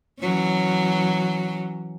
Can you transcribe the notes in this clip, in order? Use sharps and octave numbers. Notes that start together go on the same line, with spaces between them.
E3 F#3 C#4